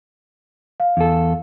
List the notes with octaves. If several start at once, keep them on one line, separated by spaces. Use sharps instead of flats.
F5
E2 A4